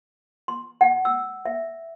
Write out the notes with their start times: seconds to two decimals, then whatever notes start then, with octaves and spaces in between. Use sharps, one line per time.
0.48 C6
0.81 F#5
1.05 E6
1.46 E5